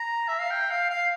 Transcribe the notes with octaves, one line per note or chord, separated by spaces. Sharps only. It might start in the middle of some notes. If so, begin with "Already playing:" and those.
Already playing: A#5
E5
F5
G5
F5
F5